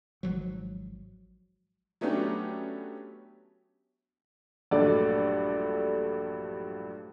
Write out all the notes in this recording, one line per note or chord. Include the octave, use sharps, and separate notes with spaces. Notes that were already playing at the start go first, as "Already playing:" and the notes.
G#1 F3 F#3
F#3 A3 B3 C#4 D4 G4
A#1 G2 F#3 A3 D5